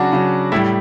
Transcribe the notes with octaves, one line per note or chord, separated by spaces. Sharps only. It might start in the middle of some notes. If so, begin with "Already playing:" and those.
Already playing: C#3 F#3 D4 F#4
C#3 F#3
A2 G3 E4